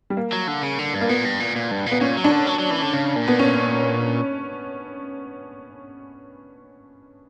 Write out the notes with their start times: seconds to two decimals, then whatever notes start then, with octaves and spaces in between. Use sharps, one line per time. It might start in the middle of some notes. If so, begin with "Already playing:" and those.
0.10 G3
0.17 A#3
0.33 F#3
0.48 D3
0.63 C#3
0.79 D3
0.94 G2
1.01 A#3
1.09 A#2 B3
1.25 G2
1.40 A#2
1.56 A#2
1.71 G2
1.86 A#2
1.91 B3
2.01 A#2 C#4
2.17 F#3
2.24 D4
2.32 D3
2.47 F#3
2.59 F#3
2.70 E3
2.82 D3
2.93 C#3
3.16 A#2
3.28 B3
3.39 C#4